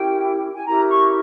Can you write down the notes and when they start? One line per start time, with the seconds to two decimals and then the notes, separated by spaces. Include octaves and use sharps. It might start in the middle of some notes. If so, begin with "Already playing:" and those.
Already playing: C#4 E4 G4 A#4 G5
0.54 G#5
0.65 C#4 E4 G4 A#4 A#5
0.87 C#6